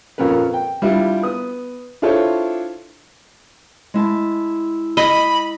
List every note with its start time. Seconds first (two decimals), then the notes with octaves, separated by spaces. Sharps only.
0.18 F2 A#2 C#4 A#4 B4
0.54 G5
0.82 G3 D4 E4 F4
1.23 B3 D#6
2.02 D4 E4 F4 A4 C5 C#5
3.94 G#3 E4 A5
4.97 D#5 B5